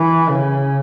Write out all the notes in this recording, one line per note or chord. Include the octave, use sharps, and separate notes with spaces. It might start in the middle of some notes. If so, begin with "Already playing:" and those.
Already playing: E3
C#3